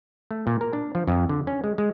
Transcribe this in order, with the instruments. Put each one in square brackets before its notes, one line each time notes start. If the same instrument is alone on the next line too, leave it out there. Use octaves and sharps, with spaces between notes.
[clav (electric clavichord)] A3
A#2
A#4
D4
F3
F2
D3
C#4
G#3
G#3